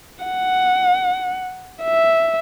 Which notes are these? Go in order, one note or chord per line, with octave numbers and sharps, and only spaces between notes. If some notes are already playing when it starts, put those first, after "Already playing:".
F#5
E5